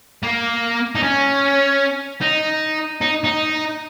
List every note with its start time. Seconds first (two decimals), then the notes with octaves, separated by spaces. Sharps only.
0.23 A#3
0.95 D#4
1.03 C#4
2.21 D#4
3.01 D#4
3.24 D#4